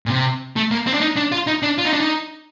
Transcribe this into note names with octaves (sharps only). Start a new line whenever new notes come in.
A#2
C3
A3
A#3
C4
D4
D#4
D4
F4
D#4
D4
F4
D#4
D4
D#4